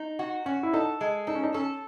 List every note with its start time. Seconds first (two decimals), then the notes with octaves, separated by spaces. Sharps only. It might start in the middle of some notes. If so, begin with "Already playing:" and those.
Already playing: D#4
0.19 F#4
0.46 C#4 F#4
0.63 E4
0.73 D#4 A4
1.01 G#3
1.27 D#4 A4
1.35 C#4
1.43 D#4
1.54 C#4 A4